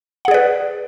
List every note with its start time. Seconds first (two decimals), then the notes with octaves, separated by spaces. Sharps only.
0.25 F#5
0.28 G#4
0.31 D5
0.34 B4